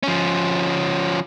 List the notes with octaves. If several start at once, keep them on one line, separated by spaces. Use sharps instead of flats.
F3 C#4